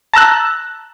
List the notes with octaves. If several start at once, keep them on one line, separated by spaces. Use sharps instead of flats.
A5 A#5 E6 F#6